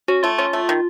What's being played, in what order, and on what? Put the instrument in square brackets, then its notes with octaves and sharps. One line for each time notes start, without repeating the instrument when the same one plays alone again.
[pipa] C#4 [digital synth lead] F#4
[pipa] A3 [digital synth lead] F4
[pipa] C#4 [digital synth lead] F4
[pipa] A3
D#3